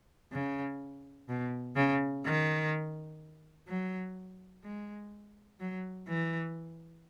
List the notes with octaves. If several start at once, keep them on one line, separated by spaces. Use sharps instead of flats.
C#3
B2
C#3
D#3
F#3
G#3
F#3
E3